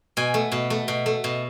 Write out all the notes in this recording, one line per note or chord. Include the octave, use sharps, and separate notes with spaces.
B2 G#5
A3
B2
A3
B2
A3
B2